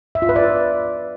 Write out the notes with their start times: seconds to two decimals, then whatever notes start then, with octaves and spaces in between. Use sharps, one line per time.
0.15 E5
0.22 F4
0.29 B4
0.36 D5